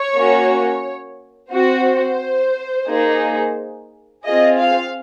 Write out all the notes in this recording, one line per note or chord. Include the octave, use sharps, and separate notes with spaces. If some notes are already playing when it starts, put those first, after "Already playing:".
Already playing: C#5
A#3 C#4 F#4
C4 F#4 C5
A#3 D#4 G#4
C4 F4 G#4 D#5
F5